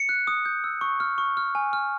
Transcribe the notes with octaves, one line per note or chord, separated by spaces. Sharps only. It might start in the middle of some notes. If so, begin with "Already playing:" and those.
Already playing: C#7
F#6
D#6
G6
E6
C#6
F6
C#6
F6
G#5
F6